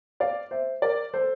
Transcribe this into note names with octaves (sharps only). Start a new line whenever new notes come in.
D5 F5
C5 E5
A#4 D5
A4 C5